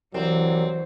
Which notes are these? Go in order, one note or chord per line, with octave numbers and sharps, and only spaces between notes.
C2 E3 F#3 C4